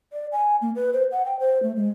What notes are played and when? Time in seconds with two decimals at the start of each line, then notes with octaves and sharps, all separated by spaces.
0.13 D5
0.32 G#5
0.62 A#3
0.76 B4
0.93 C5
1.11 F#5
1.25 G5
1.40 C5
1.63 A3
1.76 G#3